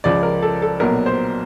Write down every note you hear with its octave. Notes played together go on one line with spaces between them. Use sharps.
C#2 C#3 F3 D5
A#4
A4
A4
B1 A#2 F#3 B3 A#4
C5